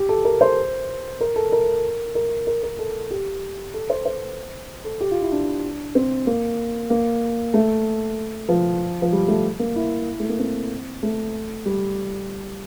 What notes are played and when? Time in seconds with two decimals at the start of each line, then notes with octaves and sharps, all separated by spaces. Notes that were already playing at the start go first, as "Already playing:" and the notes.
Already playing: G4
0.09 A4
0.25 A#4
0.41 C5
1.21 A#4
1.36 A4
1.52 A#4
2.15 A#4
2.47 A#4
2.63 A#4
2.79 A4
3.10 G4
3.74 A4
3.90 C5
4.05 C5
4.84 A4
5.00 G4
5.11 F4
5.21 E4
5.32 D4
5.95 C4
6.27 A#3
6.90 A#3
7.54 A3
8.49 F3
9.02 F3
9.12 G3
9.28 A3
9.60 A#3
9.76 E4
10.20 A3
10.29 A#3
10.39 C4
11.03 A3
11.66 G3